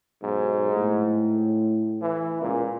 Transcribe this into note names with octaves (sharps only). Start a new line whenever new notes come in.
B1 G#2
A2
E3
C#2 A#2